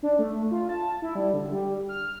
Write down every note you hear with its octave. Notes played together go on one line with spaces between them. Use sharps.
D4
A3
F4
A5
E4
G3
D3
G3
F6